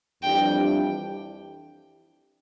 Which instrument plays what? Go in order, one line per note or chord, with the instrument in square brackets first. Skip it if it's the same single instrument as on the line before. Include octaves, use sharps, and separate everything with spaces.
[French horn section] F2 E3 G3 D4 G4 [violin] G5